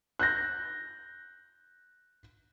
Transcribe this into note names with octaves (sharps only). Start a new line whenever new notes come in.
F#6 G6 A#6